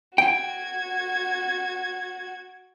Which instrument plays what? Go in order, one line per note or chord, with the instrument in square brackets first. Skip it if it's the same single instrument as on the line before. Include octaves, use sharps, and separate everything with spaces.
[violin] F#4 G#6 [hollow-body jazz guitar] G5